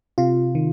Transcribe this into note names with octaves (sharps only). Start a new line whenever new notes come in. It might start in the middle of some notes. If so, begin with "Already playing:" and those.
C3 F4
D#3